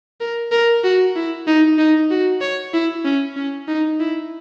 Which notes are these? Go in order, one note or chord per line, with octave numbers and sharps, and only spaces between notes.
A#4
A#4
F#4
E4
D#4
D#4
F#4
C#5
E4
C#4
C#4
D#4
E4